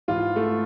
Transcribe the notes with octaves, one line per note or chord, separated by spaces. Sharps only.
G#2 E3 F4
A3